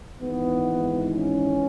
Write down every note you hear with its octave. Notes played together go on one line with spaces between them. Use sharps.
G#1 G#2 E3 B3
C#4